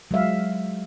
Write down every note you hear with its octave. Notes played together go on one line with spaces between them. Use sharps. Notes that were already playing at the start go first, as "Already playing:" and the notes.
F#3 G#3 E5 F5